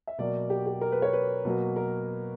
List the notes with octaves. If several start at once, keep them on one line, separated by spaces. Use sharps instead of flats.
E5
B2 F#3 A#3 D5
G4
G4
A#4
B4
C#5
B4
B2 F#3 A#3
A#4